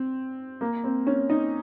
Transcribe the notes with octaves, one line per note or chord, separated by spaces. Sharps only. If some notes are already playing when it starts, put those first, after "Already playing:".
Already playing: C4
A#3
C4
C#4
D#4